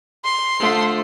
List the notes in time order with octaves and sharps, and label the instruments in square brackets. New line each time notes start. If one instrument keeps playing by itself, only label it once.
[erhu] C6
[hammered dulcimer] D3 F3 C5 [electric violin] A3